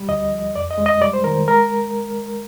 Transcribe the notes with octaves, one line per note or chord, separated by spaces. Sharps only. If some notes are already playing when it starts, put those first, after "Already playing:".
Already playing: G3
D2 D#5
F3
F2 D5
D#5
G#3
D#5
G3 D5
C5
D#3 A#4
G#3 A#4